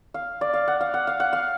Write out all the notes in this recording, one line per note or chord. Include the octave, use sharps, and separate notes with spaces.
F5
D5
F5
F#5
F5
F#5
F5
F#5
F5